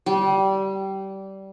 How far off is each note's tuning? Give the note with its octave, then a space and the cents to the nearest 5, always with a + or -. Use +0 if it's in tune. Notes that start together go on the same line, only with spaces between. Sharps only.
G3 -20